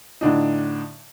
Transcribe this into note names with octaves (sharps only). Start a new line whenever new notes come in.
A2 D3 D4 D#4